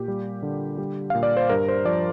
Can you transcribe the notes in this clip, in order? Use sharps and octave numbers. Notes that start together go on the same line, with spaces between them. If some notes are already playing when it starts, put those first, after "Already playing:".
Already playing: A#2 G4
G3
D3
G3
A#2 F5
D5
C5
G2 A#4
C5
F3 D5